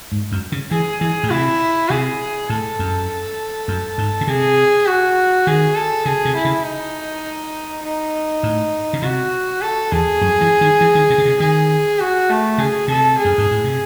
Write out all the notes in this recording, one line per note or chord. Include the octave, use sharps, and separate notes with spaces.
G#2
F#2
C#3
E3 G#4
E3 G#4
A2
C3 E4
C3 G#4
A2 A4
F#2
F#2
G#2
C#3
C3 G#4
F#4
D#3 G#4
A4
C#3 G#4
C3
E4
C#3
D#4
D#4
A2
C#3
C3 F#4
A4
E2 G#4
F#2
E3
D#3
E3
D#3
C3
C#3
C3
D#3 G#4
F#4
A3
C#3 G#4
C3 A4
G#4
F#2
G#2
A2
C3